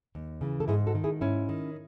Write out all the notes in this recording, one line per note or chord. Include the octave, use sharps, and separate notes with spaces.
D#2
C#3 E3
A4
G#2 E4 G#4
F#4 A4
D#3
E4 G#4
G#2 C#4 E4
D#3